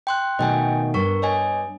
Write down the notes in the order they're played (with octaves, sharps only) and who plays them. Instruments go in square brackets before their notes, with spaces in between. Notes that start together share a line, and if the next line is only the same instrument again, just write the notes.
[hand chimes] G5 C6 F#6
[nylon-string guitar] B2 D#3 A3 [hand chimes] D#5 G5 G#5
[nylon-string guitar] G2 [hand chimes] A#4 C#6
[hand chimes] C#5 D#5 G#5